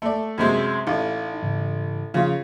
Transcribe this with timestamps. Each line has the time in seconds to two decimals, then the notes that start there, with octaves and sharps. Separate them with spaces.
0.02 A3 D5
0.38 F#2 C3 G#3
0.87 A1 D#4 F5
1.42 G#2 C#3 E3
2.14 C#3 F3 F4